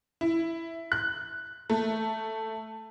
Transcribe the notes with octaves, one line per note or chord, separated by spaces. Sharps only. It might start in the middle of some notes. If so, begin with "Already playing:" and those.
E4
F#6
A3